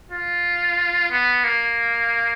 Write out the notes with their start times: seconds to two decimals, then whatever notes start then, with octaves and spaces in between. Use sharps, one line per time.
0.12 F4
1.11 B3
1.44 A#3